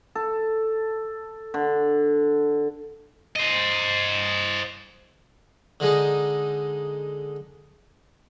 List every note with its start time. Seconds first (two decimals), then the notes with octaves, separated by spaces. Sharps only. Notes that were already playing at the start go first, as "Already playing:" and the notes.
0.15 A4
1.54 D3
3.35 C5 D#5
5.80 D3 G#3 D#4